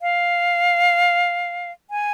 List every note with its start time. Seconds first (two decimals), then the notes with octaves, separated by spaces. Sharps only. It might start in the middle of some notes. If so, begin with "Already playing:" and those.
0.02 F5
1.90 G#5